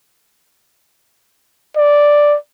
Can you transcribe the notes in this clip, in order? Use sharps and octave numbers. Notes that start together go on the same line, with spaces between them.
D5